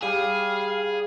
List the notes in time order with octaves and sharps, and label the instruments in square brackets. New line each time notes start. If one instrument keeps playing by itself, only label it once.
[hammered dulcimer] G3 [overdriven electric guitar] G#4 [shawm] F5